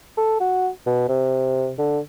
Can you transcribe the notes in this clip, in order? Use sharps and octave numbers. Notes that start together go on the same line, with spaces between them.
A4
F#4
B2
C3
D3